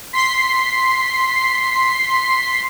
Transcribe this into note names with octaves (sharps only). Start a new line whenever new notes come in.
C6 B6 C7